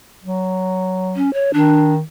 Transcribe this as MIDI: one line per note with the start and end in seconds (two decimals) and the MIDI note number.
0.24 1.26 54
1.16 1.33 61
1.33 1.53 73
1.53 2.01 51
1.53 1.93 62